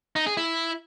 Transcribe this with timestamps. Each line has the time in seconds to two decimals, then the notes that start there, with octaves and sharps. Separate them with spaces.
0.16 D#4
0.26 G#4
0.37 E4